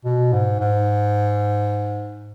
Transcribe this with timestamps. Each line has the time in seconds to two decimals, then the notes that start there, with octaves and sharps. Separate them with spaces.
0.05 B2
0.33 G#2
0.60 G#2